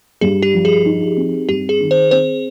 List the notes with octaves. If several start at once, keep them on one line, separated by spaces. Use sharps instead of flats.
G2 G#4
G4
F3
G#4
D#4
C4
G2 G4
G#4
D#3
C5
C4 C5